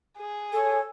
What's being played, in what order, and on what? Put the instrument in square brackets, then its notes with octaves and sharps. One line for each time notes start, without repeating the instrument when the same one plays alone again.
[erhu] G#4
[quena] A4 [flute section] C#5 [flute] G#5